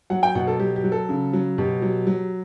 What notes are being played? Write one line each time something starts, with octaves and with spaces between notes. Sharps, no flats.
F#3 F#5
G5
B2 F#5
A4
F#3 G4
G4
F#3
A4
C#3
F#3
B2 G4
F#3
F#3